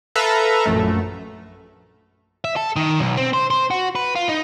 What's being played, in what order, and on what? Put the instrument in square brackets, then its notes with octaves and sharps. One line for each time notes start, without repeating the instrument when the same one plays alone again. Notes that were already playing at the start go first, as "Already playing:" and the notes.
[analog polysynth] A4 B4 E5 F5 A#5
A#1 F#2 A3
[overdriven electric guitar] E5
A4
D#3
B1
C4
C5
C5
F#4
B4
F4
D#4